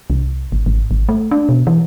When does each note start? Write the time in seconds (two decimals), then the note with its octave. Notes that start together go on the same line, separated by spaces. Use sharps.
0.10 C2
0.52 G#1
0.66 G#1
0.91 G#1
1.09 A3
1.31 D4
1.49 B2
1.67 E3